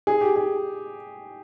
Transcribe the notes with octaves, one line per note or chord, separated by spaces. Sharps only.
G#4
G4
G#4